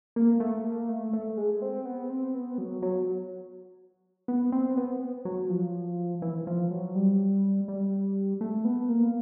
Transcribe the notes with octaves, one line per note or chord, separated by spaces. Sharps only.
A#3
A3
A#3
A3
A3
G#3
C4
B3
C4
B3
F#3
F#3
B3
C4
B3
F#3
F3
E3
F3
F#3
G3
G3
A3
B3
A#3